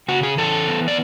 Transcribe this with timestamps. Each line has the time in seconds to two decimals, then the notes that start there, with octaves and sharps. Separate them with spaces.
0.08 C#3 F#4
0.23 G#4
0.37 E3 A4
0.68 B3
0.88 D5